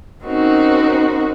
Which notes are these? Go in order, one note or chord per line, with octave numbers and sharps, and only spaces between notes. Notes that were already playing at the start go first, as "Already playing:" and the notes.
C4 C#4 D#4 F#4 A#4